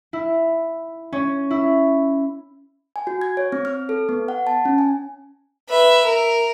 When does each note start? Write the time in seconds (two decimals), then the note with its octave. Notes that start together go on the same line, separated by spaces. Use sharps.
0.13 E4
1.13 C#4
1.51 E4
2.96 G#5
3.07 F#4
3.21 G#6
3.37 C#5
3.52 C4
3.65 F6
3.89 A4
4.09 B3
4.28 F#5
4.47 A5
4.65 C#4
4.78 G#5
5.69 B4 E5
6.04 A#4